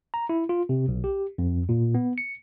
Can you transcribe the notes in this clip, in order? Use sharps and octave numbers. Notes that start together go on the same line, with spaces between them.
A#5
E4
F4
C3
B1
G4
F2
A#2
B3
C#7